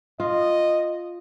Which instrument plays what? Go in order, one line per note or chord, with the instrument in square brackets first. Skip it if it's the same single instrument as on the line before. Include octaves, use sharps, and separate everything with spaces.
[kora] F4 [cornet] D#5